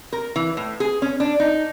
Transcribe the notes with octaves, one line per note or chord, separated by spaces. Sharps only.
A#4
E3
A2
G#4
C#4
D4
D#4